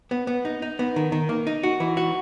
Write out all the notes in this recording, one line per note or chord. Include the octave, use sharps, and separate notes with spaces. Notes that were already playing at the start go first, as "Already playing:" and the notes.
B3
B3
D#4
D#4
B3
D#3
D#3
A#3
D#4
F#4
E3
F#4